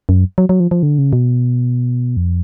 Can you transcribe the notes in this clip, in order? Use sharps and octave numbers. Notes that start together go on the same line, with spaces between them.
F#2
F#3
F#3
F3
F3
D3
C#3
B2
F2